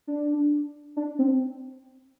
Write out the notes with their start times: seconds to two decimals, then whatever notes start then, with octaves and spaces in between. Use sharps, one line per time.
0.07 D4
0.97 D4
1.19 C4